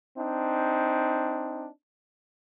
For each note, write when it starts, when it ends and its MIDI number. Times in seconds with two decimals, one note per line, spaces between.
0.18 1.68 60
0.18 1.68 62
0.18 1.68 63